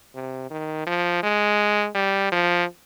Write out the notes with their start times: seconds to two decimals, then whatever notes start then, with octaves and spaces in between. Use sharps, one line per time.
0.15 C3
0.51 D#3
0.87 F3
1.23 G#3
1.95 G3
2.32 F3